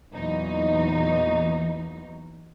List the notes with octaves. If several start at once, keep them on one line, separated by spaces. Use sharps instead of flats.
E2 A#2 E3 F#3 D#4